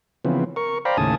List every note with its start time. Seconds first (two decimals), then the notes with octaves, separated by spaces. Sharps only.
0.25 C#3 E3 F3 B3 C4
0.56 A#4 C#6
0.85 C5 D5 F5 G5 A#5 B5
0.97 D#2 A2 C#3 G#5 A5 D#6